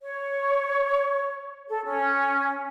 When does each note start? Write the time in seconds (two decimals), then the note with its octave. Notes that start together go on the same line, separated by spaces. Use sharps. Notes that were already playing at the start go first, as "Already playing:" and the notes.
0.01 C#5
1.69 A4
1.85 C#4